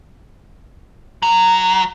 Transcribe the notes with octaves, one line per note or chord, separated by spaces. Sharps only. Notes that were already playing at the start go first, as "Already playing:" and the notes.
F#3